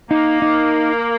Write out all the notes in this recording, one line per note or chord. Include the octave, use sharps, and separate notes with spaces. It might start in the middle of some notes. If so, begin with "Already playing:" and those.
A#3 D#4
D#4